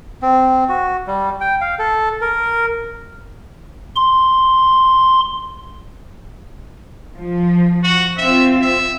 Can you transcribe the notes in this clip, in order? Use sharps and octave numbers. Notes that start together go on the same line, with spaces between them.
C4
F#4
G3
G5
F5
A4
A#4
C6
F3
F#4
C4 F4 E5
E5